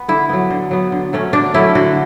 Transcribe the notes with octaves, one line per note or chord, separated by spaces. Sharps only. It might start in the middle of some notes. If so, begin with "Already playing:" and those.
Already playing: B3
D3 E4
F#3 B3
D3
F#3 B3
D3
F#3 A3 C#4
D3 D4
F#3 A3 C#4 E4
D3 F#4